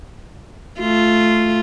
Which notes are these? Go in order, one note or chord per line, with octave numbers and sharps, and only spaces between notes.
A3 F4